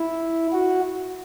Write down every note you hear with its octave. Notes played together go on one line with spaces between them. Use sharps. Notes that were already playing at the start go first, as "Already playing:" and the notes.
Already playing: E4
F#4